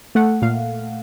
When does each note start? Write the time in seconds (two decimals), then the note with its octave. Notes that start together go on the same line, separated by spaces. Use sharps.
0.15 A3 F#5
0.42 A#2 F5